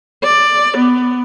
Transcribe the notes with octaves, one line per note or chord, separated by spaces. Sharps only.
D5
B3